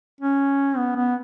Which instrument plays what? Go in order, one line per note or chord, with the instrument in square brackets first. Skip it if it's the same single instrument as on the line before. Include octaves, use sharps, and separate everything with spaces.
[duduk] C#4
B3
B3